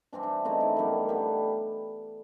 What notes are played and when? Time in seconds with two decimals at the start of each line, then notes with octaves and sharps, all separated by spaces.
0.13 C3 E3 G3 C4 D4
0.23 D4
0.45 C#3 E3 A3 C4 D#4
0.61 E4
0.76 F#2 D#3 G3 B3
1.09 D3 G3 B3